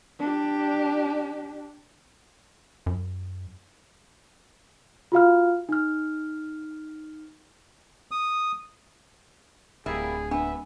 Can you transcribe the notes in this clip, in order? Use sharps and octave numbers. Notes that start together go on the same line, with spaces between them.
D4 G4
F#2
F4 F#4 F5 F6
D#4 F6
D#6
D1 G3 A#3 E4 G#4
B3 D4 E5